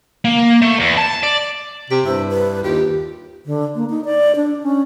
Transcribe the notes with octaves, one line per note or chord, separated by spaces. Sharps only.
A#3
A3
E2
A5
D5
C3 G4
G2 E4 C5
B4
D#2 F4 G4
D3
A#3
D#4
D5
D4
C#4